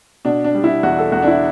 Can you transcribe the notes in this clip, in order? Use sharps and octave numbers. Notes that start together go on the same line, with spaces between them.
B2 D4
D4
G3
E4
E2 F#4
A4
E2 F#4
D4
E4